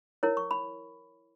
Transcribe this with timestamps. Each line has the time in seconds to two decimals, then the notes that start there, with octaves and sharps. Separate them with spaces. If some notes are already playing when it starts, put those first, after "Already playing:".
0.23 E4 A#4 C#5
0.37 C#6
0.51 B5